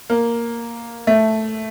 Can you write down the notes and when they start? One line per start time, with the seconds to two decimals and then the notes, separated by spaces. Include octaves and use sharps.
0.10 A#3
1.07 A3